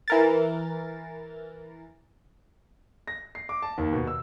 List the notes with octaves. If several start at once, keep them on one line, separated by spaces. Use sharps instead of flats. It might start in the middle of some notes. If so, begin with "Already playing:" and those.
E3 A#4 A6
A#6
C7
D6
A5
D#2
B2
E6